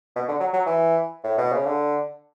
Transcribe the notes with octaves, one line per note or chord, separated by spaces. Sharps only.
B2
D3
F#3
F#3
E3
A2
B2
C#3
D3